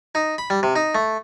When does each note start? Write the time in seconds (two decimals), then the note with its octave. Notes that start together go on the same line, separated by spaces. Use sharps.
0.15 D#4
0.38 B5
0.50 G3
0.63 C3
0.76 D#4
0.95 A3